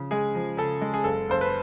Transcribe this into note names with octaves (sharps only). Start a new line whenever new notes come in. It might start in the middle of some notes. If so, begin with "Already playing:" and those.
Already playing: C#3 F3
G#3 G#4
F3
C#3 A4
G#3
G#4
F#1 A4
F#1 C5
B4